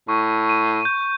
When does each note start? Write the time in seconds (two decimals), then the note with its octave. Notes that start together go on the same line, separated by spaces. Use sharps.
0.09 A2 C#6
0.49 D#7
0.85 G6